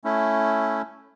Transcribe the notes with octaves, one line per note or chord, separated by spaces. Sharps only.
A3 C#4 E4